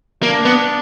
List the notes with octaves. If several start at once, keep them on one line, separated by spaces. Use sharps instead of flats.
A#3 D4
B3